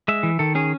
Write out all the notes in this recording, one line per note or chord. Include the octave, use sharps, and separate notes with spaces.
G#3 E5
E3
D#3 A4
C#4 G#4